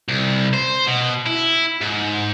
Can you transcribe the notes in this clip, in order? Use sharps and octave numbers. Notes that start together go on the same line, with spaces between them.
C2
C5
B2
E4
G#2